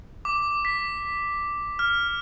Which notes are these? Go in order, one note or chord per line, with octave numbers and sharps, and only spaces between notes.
D6
B6
F6